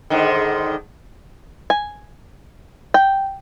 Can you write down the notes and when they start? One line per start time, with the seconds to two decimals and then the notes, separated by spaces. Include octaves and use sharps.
0.10 G#2 D3 D#3
1.70 G#5
2.94 G5